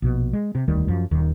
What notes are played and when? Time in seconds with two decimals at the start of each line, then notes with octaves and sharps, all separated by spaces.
0.02 A#1 B2
0.33 G#3
0.55 C3
0.68 E1 D2 D#3 G3
0.88 F#2 F3
1.11 D#1 D#2 D#3